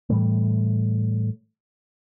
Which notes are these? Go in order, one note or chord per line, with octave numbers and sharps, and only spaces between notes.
A2 E3 G3 A3